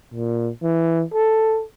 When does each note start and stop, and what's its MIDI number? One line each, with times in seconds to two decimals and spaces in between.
0.14 0.50 46
0.63 1.04 52
1.14 1.64 69